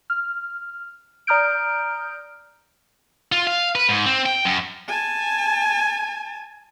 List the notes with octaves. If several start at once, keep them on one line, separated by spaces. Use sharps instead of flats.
F6
D5 A#5 D#6 F6 G6 D7
F4
F5
B4
G#2
C4
G5
F#2
G#5 A5